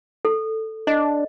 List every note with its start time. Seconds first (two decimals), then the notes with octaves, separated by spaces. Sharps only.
0.25 A4
0.87 D4 D#5